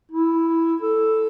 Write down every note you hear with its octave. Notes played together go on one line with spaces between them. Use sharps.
E4
A4